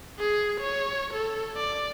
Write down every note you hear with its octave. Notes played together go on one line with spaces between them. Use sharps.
G#4
C#5
A4
D5